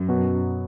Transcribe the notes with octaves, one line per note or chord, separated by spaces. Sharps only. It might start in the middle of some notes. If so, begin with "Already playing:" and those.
Already playing: F#2
B2 F#3 B3 F#4